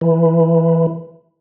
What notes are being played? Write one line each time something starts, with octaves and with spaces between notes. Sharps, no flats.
E3